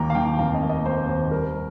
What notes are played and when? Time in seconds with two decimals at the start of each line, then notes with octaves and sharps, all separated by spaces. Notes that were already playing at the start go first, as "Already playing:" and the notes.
Already playing: D#2 D#3 A#3 G5 A#5
0.10 F5
0.15 D#3 G5
0.39 F1 F5
0.54 D#5
0.62 A#3
0.69 D#5
0.85 A#3 C5
1.09 D#2 C5
1.31 G3 A#4